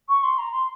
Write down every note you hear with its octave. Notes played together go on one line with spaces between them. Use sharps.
C#6
C6
A#5
C6